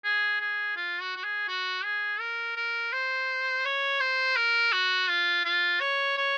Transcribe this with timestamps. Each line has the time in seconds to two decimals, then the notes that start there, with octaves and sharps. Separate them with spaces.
0.04 G#4
0.40 G#4
0.76 F4
1.01 F#4
1.16 F#4
1.24 G#4
1.48 F#4
1.85 G#4
2.20 A#4
2.57 A#4
2.93 C5
3.65 C#5
4.00 C5
4.36 A#4
4.73 F#4
5.09 F4
5.45 F4
5.81 C#5
6.17 C#5